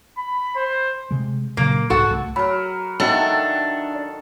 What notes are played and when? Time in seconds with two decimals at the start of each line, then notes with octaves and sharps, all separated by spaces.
0.18 B5
0.56 C5
1.11 C3 G#3
1.57 A#2 C#3 F#3 A#3
1.90 C2 G#2 F#4 A4 F#5
2.09 C2 G3 A3
2.36 F#3 A#4 B5
3.00 D#3 D4 A4 E5 F#5 G5